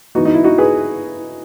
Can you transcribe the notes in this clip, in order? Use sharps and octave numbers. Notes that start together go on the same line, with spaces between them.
E3 B3 D#4 F#4
D#4
E4
D#4 F#4
G#4 B4